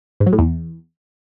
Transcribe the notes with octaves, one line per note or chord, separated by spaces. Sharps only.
G#2
F#3
A2
E2